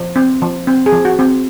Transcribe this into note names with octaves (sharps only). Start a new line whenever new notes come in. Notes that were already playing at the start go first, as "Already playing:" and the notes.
Already playing: F3
C4
F3
C4
G#4
F3
F#4
C4